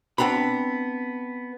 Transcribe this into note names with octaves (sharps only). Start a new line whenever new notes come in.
B3 C4 D4 A#5 B5